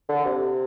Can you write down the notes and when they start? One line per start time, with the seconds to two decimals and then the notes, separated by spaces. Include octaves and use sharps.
0.09 D3
0.25 C3